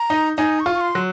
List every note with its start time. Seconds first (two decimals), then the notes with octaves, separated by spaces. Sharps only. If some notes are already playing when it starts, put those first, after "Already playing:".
Already playing: A#5
0.10 D#4
0.38 D#4 G#5
0.60 C#6
0.66 F4
0.75 C#6
0.81 C6
0.95 F#3